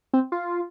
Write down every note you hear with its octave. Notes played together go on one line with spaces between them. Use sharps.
C4
F4